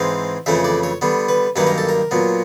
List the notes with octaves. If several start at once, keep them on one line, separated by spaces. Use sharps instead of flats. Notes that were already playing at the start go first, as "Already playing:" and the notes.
Already playing: G#2 E3 G#3 C4 F5
F2 C#3 E3 A3 C#4 E5
D5
C#5
D3 G3 B3
B4
G2 D#3 F#3 A#3 C#4 B4
A#4
A4
A#4
A#2 F#3 B3